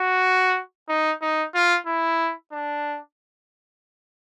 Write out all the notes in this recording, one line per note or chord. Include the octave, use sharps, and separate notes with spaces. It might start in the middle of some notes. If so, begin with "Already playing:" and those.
Already playing: F#4
D#4
D#4
F4
E4
D4